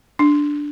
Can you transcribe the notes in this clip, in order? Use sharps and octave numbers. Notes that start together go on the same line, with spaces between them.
D4